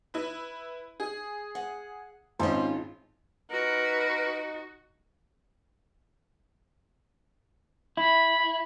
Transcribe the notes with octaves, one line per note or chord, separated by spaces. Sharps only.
E4 B4
G#4
F#5
G#1 G#2 C#4 F4 C5
D#4 F#4 A#4 B4
E4 B5